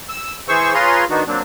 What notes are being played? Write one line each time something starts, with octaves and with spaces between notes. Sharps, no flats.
E6
E3 G#4 C5 C#6 E6
F4 G#4 B4 C#5 A#5 C6
D#3 B3 D4 D#4 F#4
F#3 A#3 C4 D4